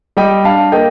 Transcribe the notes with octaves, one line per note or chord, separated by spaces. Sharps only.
G3 D#5 G5
D4 F5 A5
A#3 D#5 G5